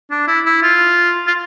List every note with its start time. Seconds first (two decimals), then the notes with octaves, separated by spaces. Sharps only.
0.11 D4
0.28 E4
0.46 E4
0.63 F4
1.27 F4